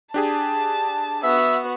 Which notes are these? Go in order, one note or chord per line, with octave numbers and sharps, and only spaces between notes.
D4 G4 G#4 A5
B3 F#4 E5